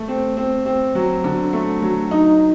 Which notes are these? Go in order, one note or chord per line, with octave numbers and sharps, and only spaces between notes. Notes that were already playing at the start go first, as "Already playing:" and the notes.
Already playing: A3
C4
C4
C4
F#3
D3
A3
F#3
D#4